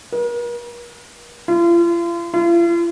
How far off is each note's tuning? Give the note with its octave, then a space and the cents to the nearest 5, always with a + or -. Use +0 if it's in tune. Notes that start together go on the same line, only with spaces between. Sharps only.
A#4 +45
F4 -40
F4 -45